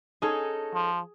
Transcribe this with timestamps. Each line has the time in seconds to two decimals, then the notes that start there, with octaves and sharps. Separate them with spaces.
0.22 C#4 D#4 G#4 A4
0.74 F3